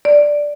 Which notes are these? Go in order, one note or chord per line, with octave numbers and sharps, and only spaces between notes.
D5